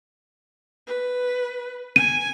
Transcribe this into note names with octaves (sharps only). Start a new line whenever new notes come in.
B4
G#5 D#7